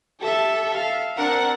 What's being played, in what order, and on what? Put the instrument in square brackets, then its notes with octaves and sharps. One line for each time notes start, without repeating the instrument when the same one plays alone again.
[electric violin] G4 E5 [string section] A4
[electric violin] E5 F5
[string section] C4 D4 F#5 [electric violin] A#4